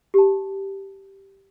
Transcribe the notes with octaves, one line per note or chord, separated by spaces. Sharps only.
G4 A5